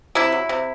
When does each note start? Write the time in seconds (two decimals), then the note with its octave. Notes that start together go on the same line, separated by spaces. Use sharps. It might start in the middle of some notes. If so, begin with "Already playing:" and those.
0.15 C3 E4
0.32 F#3
0.49 C3